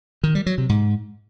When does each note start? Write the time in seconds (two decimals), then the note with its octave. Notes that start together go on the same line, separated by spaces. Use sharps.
0.24 D#3
0.35 G3
0.46 F#3
0.58 C3
0.69 G#2